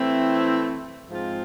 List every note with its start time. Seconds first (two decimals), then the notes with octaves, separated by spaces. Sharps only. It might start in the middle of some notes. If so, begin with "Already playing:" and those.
Already playing: E3 A3 C4 E4
1.08 G#2 F3 G#3 C4 F4